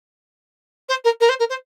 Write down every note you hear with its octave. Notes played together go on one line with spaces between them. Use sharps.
C5
A#4
A#4
C5
A#4
C5